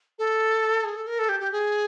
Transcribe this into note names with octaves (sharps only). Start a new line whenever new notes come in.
A4
G#4
A4
A#4
A4
G4
G4
G#4